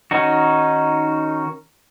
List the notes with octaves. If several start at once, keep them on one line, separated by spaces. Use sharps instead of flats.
D#3 C#4 D#4 F#4